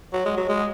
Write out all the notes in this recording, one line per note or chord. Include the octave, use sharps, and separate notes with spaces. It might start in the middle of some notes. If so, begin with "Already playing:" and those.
F#3
G#3
F#3
G#3